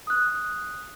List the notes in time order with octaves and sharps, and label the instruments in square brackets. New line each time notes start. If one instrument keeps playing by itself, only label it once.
[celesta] D#6 F#6